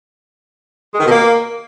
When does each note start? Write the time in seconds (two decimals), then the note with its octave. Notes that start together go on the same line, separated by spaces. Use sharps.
0.94 G#3
1.00 D#3
1.05 B2
1.11 A#3